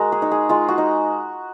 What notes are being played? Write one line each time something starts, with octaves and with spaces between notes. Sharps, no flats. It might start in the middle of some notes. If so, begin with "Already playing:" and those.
Already playing: G#3 F#4 A#4
G#4
D#4
G#4
G#3 F4
F#4
D#4